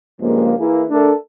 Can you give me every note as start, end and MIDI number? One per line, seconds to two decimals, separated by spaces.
0.21 0.54 43
0.21 0.54 49
0.21 0.54 53
0.21 0.54 56
0.21 0.54 58
0.59 0.82 52
0.59 0.82 58
0.59 0.82 64
0.59 0.82 68
0.90 1.13 57
0.90 1.13 62
0.90 1.13 69
0.90 1.13 70